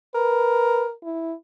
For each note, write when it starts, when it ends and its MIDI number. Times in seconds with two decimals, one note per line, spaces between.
0.15 0.92 70
0.15 0.84 71
1.03 1.33 64